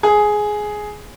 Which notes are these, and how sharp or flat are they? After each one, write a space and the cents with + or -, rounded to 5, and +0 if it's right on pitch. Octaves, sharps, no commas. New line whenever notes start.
G#4 +10